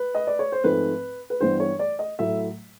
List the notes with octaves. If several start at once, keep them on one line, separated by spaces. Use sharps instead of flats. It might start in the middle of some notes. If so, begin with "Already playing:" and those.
Already playing: B4
D#5
D5
C#5
C5
G#2 F3 A3 C4 B4
B4
G2 E3 G3 B3 C5
C#5
D5
D#5
A2 F#3 A3 E5